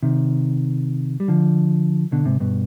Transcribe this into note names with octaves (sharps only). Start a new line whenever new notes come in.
C3 D#3
G3
D3 F3
B2 D3
G#2 C3
G2 B2